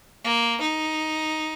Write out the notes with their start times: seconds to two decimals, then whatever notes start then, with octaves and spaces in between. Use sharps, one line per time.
0.25 A#3
0.62 D#4